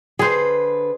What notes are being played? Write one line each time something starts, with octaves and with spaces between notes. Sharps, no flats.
D3 G#4 B4 C5